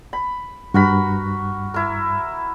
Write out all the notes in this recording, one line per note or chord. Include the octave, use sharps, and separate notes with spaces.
B5
G2 F#4 A#4 B5
E4 A#4